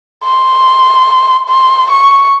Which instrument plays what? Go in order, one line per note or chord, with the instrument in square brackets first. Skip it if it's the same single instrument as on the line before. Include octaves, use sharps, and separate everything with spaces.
[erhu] C6
C6
C#6